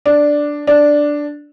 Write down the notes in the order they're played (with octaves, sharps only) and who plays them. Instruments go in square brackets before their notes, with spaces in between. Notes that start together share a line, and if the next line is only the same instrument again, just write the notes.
[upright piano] D4
D4